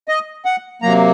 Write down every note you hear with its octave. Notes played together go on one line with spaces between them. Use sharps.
D#5
F#5
C3 F#3 A#3 A#5